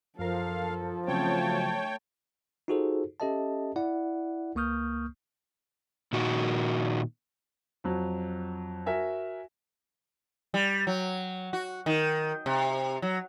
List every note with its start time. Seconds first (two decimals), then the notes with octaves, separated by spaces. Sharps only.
0.19 F#2 F3 A4 A#4 F5
1.07 C#3 F#3 A3 C4 C#5 G5 A5
2.68 D#4 F4 F#4 G#4 A4 C5
3.20 C#4 G4 A4 D#5 E5 A5
3.76 E4 D5 F#5
4.55 C#2 A#3 C#6 D#6 F6 G6
6.13 A#2 D#3 F#4
7.84 F2 F#3
8.86 F#4 A#4 E5 G#5
10.54 G3
10.87 F#3
11.53 F#4
11.86 D#3
12.46 C3
13.02 F#3